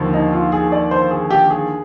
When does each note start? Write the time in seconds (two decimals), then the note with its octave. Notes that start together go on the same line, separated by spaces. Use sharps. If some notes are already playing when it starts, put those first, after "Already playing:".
Already playing: D#2 D3 F3
0.13 D#4
0.33 F4
0.52 G#4
0.72 D5
0.91 C5
1.11 G#4
1.30 G4
1.50 G#4